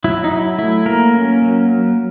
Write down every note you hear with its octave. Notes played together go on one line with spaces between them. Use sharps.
F#3 E4
D#4
F#3 E4
A3 E4
F#3 A#3 A#4
C#4
F#3